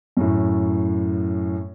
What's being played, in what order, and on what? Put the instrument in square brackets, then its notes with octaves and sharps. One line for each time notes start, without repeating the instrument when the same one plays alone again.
[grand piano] F#2 A2